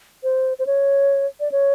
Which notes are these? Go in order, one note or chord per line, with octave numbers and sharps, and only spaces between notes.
C5
C5
C#5
D5
C#5